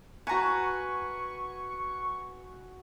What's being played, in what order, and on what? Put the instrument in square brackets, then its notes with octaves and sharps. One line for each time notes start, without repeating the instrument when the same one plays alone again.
[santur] F#4 G#5 [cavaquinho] B4 A#5 [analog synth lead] C#6